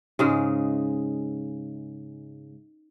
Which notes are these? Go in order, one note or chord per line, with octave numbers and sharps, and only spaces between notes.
G#2 C#3 G#3